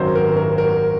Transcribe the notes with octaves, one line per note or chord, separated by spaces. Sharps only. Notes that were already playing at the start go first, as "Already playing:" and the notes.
Already playing: G#1 F#2 D#3 F#3 C5
A#4
A#4
A#4